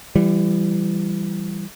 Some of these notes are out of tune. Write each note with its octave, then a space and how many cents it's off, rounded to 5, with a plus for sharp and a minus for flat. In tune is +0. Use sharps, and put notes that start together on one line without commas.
E3 +30 G3 +0